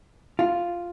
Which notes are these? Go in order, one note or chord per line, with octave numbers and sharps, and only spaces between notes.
F4